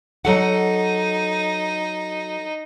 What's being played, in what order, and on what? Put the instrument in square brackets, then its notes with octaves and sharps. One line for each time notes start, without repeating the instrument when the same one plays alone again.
[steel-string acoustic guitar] F#3 A4 F#5 [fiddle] D#4